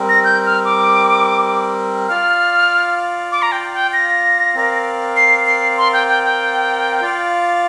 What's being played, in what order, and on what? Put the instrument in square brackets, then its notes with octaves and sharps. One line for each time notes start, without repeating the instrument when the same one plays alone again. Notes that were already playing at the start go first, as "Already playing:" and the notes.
Already playing: [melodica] G3 C4 A#4
[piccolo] A#6
G6
F6
D6
[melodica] F4 D5 F5 [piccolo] F6
[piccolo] D6
A#5
G5
G5
A#6
[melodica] C4 A#4 D5 F5
[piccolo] C7
C7
C6
G5
G5
G5
[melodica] F4 D5 F5